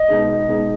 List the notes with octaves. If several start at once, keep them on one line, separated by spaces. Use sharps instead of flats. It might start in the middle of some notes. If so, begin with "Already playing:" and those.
Already playing: D#5
B2 G#3 D#4 G#4
B2 G#3 D#4 G#4